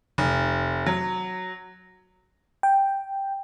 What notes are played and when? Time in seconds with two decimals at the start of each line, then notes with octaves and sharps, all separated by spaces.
0.18 F1
0.86 F#3
2.63 G5